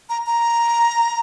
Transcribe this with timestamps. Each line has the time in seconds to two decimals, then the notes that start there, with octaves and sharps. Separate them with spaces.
0.10 A#5
0.26 A#5